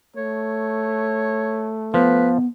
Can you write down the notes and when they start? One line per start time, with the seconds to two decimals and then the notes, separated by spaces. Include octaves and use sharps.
0.16 A3 C#5
1.94 F3 B3 B4